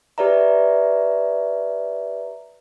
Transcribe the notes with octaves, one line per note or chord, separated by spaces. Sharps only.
G4 B4 D5 E5 A#5